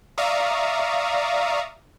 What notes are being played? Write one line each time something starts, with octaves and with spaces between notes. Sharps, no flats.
D5 E5 F5 A#5 C#6 D#6